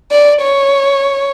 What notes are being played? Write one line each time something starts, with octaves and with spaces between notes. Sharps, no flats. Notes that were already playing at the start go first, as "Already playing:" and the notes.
D5
C#5